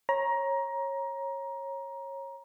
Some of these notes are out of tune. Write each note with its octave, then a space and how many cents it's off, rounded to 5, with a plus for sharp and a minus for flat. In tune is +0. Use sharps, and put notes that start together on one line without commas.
C#5 -20 A#5 +20